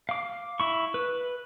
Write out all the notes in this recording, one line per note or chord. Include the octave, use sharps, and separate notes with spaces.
F5 D6
E4 C#6
B4